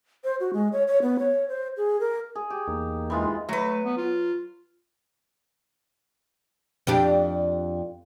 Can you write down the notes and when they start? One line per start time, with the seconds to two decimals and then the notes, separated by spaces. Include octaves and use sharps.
0.24 C5
0.40 F#4
0.53 G#3
0.73 C#5
0.87 C#5
1.02 B3
1.19 C#5
1.49 C5
1.77 G#4
2.00 A#4
2.35 G#4
2.50 G4
2.68 E2 A#3 D#4
3.10 E3 G#3 F4
3.49 F#3 A3 B4
3.84 B3
3.97 F4
6.87 F2 D4 G4